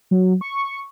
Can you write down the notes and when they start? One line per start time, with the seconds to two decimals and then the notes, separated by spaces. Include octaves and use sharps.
0.11 F#3
0.41 C#6